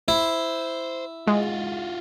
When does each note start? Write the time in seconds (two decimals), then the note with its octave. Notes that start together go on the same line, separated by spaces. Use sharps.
0.08 E4 C5
1.27 G#3 F4 F#4